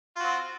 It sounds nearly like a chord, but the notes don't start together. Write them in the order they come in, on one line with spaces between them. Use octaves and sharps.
F4 F#4 C4